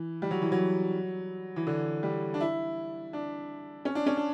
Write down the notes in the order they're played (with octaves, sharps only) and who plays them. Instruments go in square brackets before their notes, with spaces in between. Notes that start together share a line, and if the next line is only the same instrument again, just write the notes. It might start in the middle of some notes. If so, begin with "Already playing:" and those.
Already playing: [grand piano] E3
G3
F#3
E3
F#3
E3
D3
G3
D4
E4
D4
C#4
D4
C#4
D4